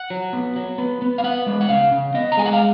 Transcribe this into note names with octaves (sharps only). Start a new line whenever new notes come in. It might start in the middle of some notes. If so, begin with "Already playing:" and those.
Already playing: F#5
F#3
B3
F#3
B3
B3
F5
B3 F#5
G#3
F#5
C#3 F5
C#3
B3 D#5
A#5
G#3 G#5
F#5
F5